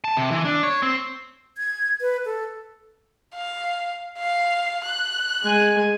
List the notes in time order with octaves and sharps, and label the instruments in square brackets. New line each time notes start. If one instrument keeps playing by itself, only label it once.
[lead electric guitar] A5
C3
E3
D4
C#5
C4
[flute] G#6
B4
A4
[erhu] F5
F5
F#6
[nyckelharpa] G#3 G#5